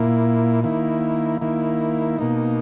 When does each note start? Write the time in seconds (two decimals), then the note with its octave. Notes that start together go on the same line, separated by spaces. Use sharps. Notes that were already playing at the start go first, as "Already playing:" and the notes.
Already playing: A#2 A#3 E4
0.64 D#3 A#3 E4
1.41 D#3 A#3 E4
2.18 B2 A#3 D#4